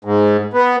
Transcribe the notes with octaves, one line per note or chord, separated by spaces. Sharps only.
G#2
B3